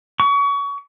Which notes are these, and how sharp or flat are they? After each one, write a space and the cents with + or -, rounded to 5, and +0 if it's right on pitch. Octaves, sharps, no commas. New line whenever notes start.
C#6 +30